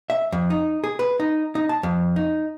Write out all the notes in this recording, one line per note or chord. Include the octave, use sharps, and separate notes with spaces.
E5
F2
D#4
G#4
B4
D#4
D#4
A5
F2
D#4